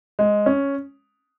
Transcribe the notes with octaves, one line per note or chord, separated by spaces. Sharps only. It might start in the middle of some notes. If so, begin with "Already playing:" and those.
G#3
C#4